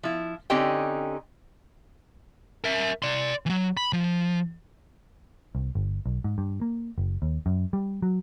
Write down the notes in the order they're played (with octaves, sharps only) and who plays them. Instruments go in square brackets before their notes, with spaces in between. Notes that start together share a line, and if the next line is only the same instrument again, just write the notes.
[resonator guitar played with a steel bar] F3 E4
D3 C4 C#4 D#4 G4 G5
[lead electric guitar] A#4 E5
D5 C6
E3 F#3
B5
F3
[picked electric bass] C2
G1
B1
G#2
G2
A#3
F#1
D#2
F#2
G3
F#3